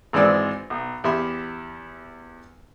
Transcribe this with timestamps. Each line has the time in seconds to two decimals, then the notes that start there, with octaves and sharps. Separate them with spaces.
0.13 G#1 E3 G#3 C4 D5 E6
0.70 B1
1.04 E2 G4 E5 B5 C6